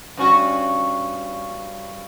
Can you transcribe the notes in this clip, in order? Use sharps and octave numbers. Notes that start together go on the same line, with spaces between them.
G2 C#4 F#4